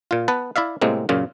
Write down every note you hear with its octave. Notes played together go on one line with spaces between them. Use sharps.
A#2 F4
B3 B4 A5
E4 D5 E5 F5
A2 C3 G#3 A#3 C4
F#2 A#2 C#3 F4